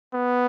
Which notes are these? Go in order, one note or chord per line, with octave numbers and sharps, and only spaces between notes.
B3